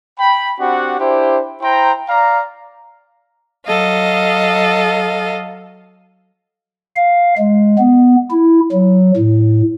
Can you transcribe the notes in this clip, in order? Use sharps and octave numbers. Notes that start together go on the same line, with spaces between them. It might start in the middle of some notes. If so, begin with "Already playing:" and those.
G5 B5
C4 D4 F#4 G4 F#5
D4 E4 G4 C5
E4 C5 G5 A#5
D5 F5 A#5
F#3 A4 D#5 F5
F5
G#3
B3
E4
F#3
A2